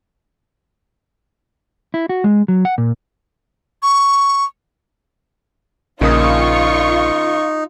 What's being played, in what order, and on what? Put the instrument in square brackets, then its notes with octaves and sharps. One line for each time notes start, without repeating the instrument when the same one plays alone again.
[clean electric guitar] E4
F#4
G#3
F#3
F#5
A#2
[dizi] C#6
[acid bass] A#1 [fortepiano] C#3 A#3 D#6 [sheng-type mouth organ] D#4 [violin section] F4 C#6